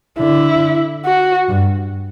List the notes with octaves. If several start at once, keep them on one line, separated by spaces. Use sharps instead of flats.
D3 E4
F#4
G2